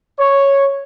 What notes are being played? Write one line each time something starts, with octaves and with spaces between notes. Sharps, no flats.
C#5